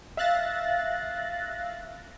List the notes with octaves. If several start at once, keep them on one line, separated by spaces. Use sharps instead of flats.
E5 F5 F#6 A6 A#6